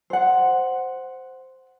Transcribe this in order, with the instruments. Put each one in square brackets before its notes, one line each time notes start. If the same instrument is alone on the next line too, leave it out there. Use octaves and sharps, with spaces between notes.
[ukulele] C5 F#5